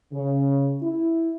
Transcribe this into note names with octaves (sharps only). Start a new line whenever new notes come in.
C#3
E4